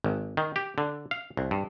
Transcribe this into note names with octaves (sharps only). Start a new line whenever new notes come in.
G#1
D#3
G4
D3
F5
C2
G2